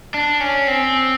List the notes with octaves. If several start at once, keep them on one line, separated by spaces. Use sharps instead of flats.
D4
C#4
C4